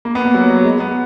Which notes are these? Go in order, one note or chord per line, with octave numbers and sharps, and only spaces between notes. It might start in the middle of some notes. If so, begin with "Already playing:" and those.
A#3
B3
A#3
F#3
F#3
G#3
B3